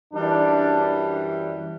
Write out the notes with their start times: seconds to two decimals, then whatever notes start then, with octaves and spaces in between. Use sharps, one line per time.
0.13 F#2 E3 G3 D4